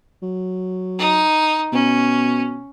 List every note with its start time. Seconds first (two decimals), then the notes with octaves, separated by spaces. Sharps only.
0.22 F#3
0.99 D#4
1.73 B2 C#4